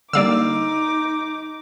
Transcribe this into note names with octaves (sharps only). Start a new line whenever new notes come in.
D3 G3 A#3 D#4 D5 F5 D6 E6